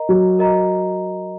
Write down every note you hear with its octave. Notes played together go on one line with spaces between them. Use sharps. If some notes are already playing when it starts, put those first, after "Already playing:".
Already playing: A#4 D#5 A#5
F#3
A#4 D#5 A#5